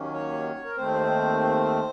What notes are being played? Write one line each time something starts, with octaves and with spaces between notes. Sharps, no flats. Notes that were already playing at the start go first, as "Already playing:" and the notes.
Already playing: D#2 D#3 F#3 A#3 C#4
C#5
A#4
D#2 D#3 A3 C4 C5